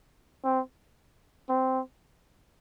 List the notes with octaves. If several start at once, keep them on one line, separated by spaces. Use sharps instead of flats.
C4
C4